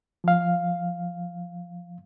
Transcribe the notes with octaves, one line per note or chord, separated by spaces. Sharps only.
F3 F5